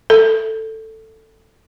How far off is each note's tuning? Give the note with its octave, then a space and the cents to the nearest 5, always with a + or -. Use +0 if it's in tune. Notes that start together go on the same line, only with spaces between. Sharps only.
A4 +10